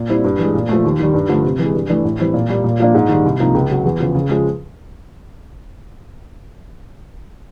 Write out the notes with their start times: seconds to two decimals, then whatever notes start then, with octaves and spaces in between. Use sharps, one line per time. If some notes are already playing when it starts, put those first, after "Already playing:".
Already playing: A#2
0.09 G3 C4 E4
0.24 G2
0.39 E3 G#3
0.54 A#2
0.69 F3 A3
0.85 D#2
1.00 D#3 G3
1.14 G2
1.29 D3 F3 A3
1.44 C3
1.59 E3 G#3
1.74 G2
1.90 E3 A3 D4
2.05 A2
2.19 E3 G3 C4 E4
2.34 A#2
2.49 G3 A#3
2.64 A#2
2.80 F3 A#3 D4
2.94 G#2
3.09 D#3 G3
3.25 C2
3.40 C3 F3 A#3 D#4
3.55 C#2
3.70 C#3 F#3
3.85 E2
4.00 C#3 F3
4.15 C#3
4.29 F3 G#3